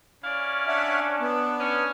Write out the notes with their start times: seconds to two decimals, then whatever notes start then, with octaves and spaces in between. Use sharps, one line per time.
0.24 C#4 E4 D5 F5
0.68 D4 E5 F#5
1.20 B3
1.61 C#4